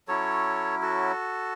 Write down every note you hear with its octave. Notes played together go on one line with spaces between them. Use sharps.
F#3 C#4 E4 A4 C#5
F#4 A4